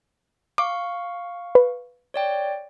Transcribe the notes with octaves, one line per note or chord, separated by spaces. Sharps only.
F5 C#6 D6
B4
C#5 D5 G5